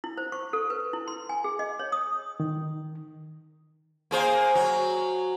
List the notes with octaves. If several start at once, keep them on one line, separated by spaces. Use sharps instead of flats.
E4
C5
C#6
A4
B4
E4
C6
G#5
G#4
D#5
C#5
D#6
D#3
A#3 G#4 C5
F#3